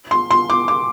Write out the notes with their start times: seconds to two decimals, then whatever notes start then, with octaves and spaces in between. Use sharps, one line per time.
0.11 C6
0.31 C6
0.50 D6
0.68 D6